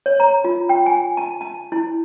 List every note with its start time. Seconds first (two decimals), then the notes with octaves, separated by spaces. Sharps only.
0.06 C#5
0.20 A#5
0.44 F4
0.69 G5
0.86 G#5
1.17 A5
1.41 A5
1.72 E4